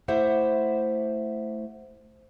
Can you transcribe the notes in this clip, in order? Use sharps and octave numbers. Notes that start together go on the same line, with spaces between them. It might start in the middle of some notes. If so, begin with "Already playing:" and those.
A3 E4 G4 C5 E5 F#5